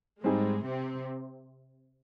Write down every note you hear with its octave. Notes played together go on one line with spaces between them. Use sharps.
G#2 G3 G#3 C4 D#4 G#4
C3 C4